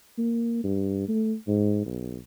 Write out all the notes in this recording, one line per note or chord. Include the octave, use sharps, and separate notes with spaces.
A#3
G2
A3
G#2
B1